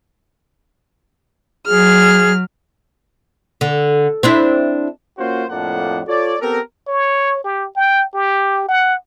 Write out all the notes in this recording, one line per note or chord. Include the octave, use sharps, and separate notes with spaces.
F#3 G#4 F6
D3
C4 D4 E4
A#3 C#4 F4 F#4 C5
F2 A2 F3 A#3 D4 F#5
F4 A4 C#5 D5
B3 C4 G4 A4 A#4
C#5
G4
G5
G4
F#5